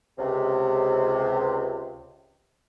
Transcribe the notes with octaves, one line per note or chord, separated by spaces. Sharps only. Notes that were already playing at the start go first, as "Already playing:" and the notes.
C#2 C3